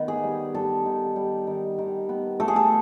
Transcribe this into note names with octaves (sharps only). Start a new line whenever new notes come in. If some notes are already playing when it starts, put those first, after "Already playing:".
Already playing: D#3 B3
G#4
G3
G3 A4
D#3
G3
D#3
D#3
B3
A3 A4
G#4
A4